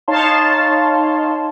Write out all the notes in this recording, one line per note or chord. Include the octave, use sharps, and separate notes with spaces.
D#4 C#5 F5 A5 C6